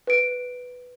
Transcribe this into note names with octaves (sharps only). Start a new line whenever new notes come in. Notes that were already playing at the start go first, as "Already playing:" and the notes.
B4 D7